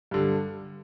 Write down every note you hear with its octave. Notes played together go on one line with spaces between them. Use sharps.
G2 D3 G3